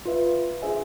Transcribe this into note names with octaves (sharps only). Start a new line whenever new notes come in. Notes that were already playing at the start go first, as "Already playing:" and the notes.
F4 B4 E5
D4 G#4 C5 E5 G#5